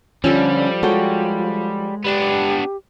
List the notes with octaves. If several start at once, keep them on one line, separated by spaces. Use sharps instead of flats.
D3 F3 G3 C#4 A4
F3 G#3 F#4 A4 C#5 G5
B3 D4 G4